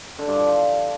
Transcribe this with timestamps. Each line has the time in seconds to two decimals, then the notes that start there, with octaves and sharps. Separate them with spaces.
0.19 D3
0.27 G2
0.36 F3